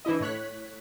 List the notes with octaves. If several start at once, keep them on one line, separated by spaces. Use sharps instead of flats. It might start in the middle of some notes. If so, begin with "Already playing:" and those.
E3 D4 E4 D#5
A2 C#5 F#6 B6